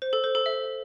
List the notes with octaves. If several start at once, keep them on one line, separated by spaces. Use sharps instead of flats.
C5
A4
C5
A4
E5